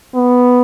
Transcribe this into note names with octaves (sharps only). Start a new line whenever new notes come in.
B3